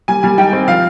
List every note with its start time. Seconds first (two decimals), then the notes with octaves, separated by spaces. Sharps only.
0.08 G3 G#5
0.23 G3 G#5
0.38 D#4 G5
0.53 C4
0.68 F3 F5